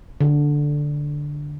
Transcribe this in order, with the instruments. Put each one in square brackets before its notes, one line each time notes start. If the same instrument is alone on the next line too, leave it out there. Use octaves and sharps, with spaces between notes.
[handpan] D3